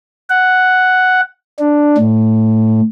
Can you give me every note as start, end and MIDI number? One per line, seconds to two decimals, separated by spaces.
0.30 1.21 78
1.59 1.97 62
1.98 2.81 45